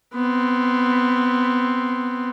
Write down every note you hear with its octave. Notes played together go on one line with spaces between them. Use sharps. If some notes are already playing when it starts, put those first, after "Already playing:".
B3 C4